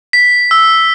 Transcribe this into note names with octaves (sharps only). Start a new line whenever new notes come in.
B6
E6